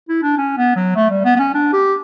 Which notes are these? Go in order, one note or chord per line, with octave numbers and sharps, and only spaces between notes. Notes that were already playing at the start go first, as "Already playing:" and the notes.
E4
D4
C#4
B3
F#3
A3
G3
B3
B3
C#4
D4
G4